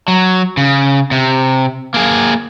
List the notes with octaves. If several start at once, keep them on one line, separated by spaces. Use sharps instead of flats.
F#3
C#3
C3
A#3 G#4